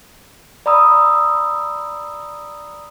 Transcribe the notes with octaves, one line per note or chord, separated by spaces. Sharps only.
D5 A#5 B5 D#6 E6